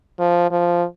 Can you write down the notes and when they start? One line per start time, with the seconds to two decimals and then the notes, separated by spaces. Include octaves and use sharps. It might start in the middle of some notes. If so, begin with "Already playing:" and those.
0.19 F3
0.51 F3